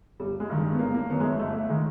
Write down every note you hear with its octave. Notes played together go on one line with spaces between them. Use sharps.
G1 G3
G#3
G2 D#3
G#3
B3
G1 A#3
A#3
F#2 D#3 B3
G#3
A3
G1 A3
A3
D#3 G#3